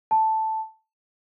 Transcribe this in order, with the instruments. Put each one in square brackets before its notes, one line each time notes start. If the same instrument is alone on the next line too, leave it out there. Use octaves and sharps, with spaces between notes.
[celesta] A5